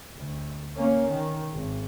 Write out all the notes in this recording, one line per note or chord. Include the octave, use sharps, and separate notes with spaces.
D2
A#3 C#4
D#3
G#1